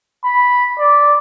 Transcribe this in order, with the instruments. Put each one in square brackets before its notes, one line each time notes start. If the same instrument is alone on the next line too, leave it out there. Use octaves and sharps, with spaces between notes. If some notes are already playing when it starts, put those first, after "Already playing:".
[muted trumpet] B5
D5